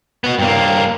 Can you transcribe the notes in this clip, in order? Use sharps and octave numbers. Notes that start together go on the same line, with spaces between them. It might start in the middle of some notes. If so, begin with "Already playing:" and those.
B3 F#4
G2 A#3